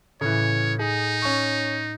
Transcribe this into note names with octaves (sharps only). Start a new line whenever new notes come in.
A2 C#3 E3 C#5
D#4 G#4
C#4 C#6